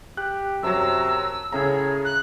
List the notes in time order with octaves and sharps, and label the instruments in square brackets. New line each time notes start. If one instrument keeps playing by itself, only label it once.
[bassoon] G4 [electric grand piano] F#6
[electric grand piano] F#2 F#3 [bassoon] C3 [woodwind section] A5 A#5 [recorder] E6
[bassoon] A2 [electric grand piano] C#3 C#4 A#5 [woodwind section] G#4
[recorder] F#6